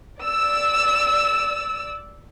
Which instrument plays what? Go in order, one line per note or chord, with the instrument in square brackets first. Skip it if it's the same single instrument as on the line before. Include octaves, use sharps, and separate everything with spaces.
[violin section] D5 E6